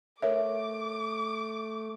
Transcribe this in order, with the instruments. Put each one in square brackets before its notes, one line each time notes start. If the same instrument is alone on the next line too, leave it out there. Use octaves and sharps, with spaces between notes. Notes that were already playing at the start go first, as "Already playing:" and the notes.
[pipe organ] A3 [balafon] A#4 C#5 E5 [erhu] D6